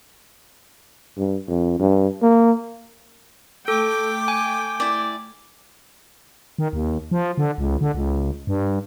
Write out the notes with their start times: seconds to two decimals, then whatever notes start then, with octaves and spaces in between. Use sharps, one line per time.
1.17 G2
1.48 F2
1.79 G2
2.22 A#3
3.68 A3 A4 G5 D6
4.28 G#5
4.80 E4 D5
6.59 D#3
6.73 D#2
7.11 F3
7.38 D3
7.58 C#2
7.81 D3
7.95 C#2
8.47 G2